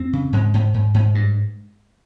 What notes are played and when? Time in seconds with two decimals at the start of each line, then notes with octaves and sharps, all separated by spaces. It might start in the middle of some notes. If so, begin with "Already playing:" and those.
Already playing: F2 C4
0.13 C#3
0.33 G#2 G#3
0.54 G#2
0.74 G#2
0.94 G#2
1.15 G2